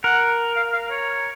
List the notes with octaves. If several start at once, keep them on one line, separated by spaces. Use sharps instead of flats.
A#4 F#5
F5
F5
C#5